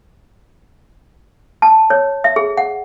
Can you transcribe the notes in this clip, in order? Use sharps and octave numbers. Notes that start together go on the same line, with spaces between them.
A5
C#5
E5
G#4
F#5